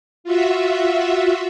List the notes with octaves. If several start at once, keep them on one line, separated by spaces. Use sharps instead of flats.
F4 F#4 E5